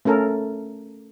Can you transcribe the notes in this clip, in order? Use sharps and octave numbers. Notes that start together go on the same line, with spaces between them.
A3 C#4 A4 A#4